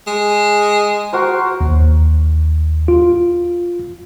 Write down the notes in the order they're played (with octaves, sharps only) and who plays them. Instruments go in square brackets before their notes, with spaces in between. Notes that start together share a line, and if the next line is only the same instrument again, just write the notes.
[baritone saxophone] G#3
[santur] F#4 A#4 C5
[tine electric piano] D#2
F4